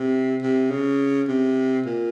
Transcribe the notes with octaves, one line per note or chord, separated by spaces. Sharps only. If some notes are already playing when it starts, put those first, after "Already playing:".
Already playing: C3
C3
C#3
C3
A#2